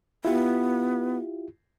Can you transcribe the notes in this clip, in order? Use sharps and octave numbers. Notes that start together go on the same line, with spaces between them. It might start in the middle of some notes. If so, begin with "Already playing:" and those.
B3 E4 F4 G4